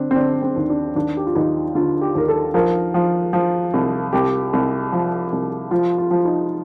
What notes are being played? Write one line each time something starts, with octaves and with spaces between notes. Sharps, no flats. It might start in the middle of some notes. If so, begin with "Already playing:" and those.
Already playing: D3 C4 D4
C4
D3 D4
C4
D#2
D4
D#2 D4
G4
F4
D#2 D#4
D3 F4
G4
D#2 A#4
A4
F3 A#4
F3
F3
C2
C2 G4
C2
F3
C2
F3 F4
F4
F3
D#4